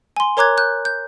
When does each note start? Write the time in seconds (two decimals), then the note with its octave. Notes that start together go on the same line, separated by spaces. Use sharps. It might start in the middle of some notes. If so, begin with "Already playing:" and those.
0.16 G#5 C6
0.37 A#4 C#5 A#5 D6 F#6 G#6
0.57 F#6 G6
0.85 G6